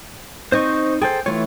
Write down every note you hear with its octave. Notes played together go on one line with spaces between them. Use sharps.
C4 D#4 C5 D#5 C#6
G#4 A4 C5 G5
E3 A3 F4 C#5